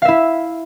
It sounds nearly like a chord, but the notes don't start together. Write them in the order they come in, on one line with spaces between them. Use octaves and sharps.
F5 E5 E4